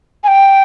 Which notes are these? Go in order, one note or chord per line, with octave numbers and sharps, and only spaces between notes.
G#5
G5